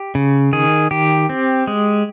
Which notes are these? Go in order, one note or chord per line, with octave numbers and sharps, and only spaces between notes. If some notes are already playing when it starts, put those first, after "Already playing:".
Already playing: G4
C#3
D#3 G#4
D#3 G4
C4
G#3